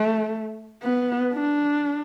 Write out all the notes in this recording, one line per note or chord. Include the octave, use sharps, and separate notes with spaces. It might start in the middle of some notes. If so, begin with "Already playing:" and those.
Already playing: A3
B3
D4